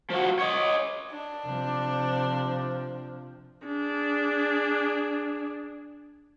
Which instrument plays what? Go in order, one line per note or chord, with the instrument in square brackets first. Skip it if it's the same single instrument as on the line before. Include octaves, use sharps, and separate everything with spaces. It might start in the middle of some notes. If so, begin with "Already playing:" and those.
[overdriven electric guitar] F3 F#4
C#5 D#5
[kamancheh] D4
[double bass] C3 F3
[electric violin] D4 G#4